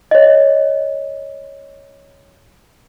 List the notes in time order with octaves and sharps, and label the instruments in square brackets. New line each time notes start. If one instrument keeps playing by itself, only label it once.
[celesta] C#5 D#5